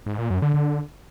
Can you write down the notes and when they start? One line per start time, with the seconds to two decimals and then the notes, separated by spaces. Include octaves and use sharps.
0.06 G#2
0.18 A#2
0.30 F#2
0.42 D3
0.54 D3